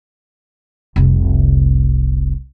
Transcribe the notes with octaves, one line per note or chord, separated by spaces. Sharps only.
F1 C2